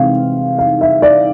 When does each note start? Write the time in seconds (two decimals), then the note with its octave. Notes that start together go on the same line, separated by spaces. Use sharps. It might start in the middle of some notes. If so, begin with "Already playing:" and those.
Already playing: C3 E3 G#3 C4 F5
0.59 F5
0.81 E5
1.02 D5